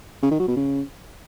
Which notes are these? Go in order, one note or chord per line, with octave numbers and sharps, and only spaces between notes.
C#3
D#3
F#3
B2
C#3